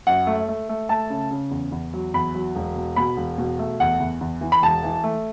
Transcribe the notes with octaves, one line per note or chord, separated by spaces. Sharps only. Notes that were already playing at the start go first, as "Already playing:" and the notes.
F#2 F#5
A3
A3
A3
A3 A5
C#3
C#3
E2
E2
F#3
E2 B5
F#3
E1
B2
B2 B5
E1
B2
A3
E2 F#5
E2
E2
E3
B5
E1 A5
E3
A3